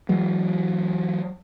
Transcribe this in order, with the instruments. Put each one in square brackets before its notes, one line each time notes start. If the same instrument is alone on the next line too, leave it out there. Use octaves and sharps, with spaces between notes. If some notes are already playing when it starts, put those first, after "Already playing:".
[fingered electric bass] E3 F#3 G#3